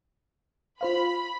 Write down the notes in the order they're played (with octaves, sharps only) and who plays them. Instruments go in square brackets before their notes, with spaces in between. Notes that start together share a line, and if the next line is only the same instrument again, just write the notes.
[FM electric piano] F4 C5 F5 [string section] B5